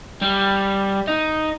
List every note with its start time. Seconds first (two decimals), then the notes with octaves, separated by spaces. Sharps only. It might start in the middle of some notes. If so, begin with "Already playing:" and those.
0.22 G3
1.07 D#4